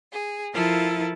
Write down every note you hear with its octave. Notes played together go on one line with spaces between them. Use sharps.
G#4
F3 E4 F4 A4 A#4